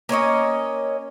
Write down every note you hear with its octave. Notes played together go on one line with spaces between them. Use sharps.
A#3 C#4 C#5 D#5